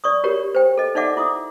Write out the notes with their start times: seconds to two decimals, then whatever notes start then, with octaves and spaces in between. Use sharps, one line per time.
0.04 D5 C#6 D#6
0.24 F#4 G4 A#4 C#5
0.55 C5 G5
0.77 A4 D#5
0.95 D#4 A4 D5 E5 F#5 D6
1.17 E4 D6 D#6